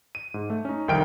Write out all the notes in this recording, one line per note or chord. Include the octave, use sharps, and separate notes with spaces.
D#7
G#2
A3
C#4 D#4
C2 F2 D#3 G5 F6 D7